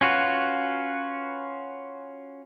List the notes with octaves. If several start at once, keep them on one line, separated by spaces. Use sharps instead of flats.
C#4 F4 F#4 B4